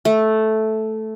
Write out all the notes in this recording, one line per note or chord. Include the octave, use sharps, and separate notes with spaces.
A3